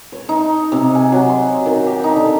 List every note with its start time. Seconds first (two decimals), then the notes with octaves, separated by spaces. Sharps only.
0.12 C#5
0.29 D#4
0.72 C3
0.95 G#5
1.12 F#3
1.29 C6
1.66 D#3
1.87 G4
2.04 D#4
2.16 D3